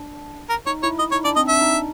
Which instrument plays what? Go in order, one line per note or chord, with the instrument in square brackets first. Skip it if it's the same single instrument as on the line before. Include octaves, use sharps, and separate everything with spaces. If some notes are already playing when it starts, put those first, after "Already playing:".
Already playing: [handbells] D4
[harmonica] A#4
[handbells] D#4 [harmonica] C#5
[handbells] E4 [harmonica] C#5
[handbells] E4 [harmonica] D#5
[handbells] D#4 [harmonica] C#5
[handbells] D4 [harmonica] D5
[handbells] C4 [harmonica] D#5
[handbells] D4 [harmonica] E5
[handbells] D#4
D#4